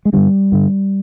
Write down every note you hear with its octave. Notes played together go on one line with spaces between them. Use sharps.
G#3
G2 D3 G3
G2 D3